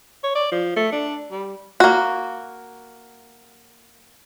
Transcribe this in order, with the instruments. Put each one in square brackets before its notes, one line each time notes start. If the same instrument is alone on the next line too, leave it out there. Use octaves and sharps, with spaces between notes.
[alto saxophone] C#5
D5
F3
A3
D4
G3
[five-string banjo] A#3 F#4